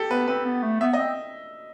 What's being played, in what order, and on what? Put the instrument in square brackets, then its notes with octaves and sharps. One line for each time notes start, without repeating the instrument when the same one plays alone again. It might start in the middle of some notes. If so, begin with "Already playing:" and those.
Already playing: [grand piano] G4 A4
[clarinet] B3 [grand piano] B4
[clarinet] C4 [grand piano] B4
[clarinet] B3
A3
[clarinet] B3 [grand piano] E5
[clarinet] C4 [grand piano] D#5